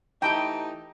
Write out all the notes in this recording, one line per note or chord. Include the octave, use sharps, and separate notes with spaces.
E3 A3 D#4 G4 G5 A5 A#5 D#6